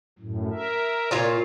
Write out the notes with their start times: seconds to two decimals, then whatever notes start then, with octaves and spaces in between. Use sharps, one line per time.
0.19 F#2 A2
0.51 A#4 E5
1.11 A#2 F4 C#5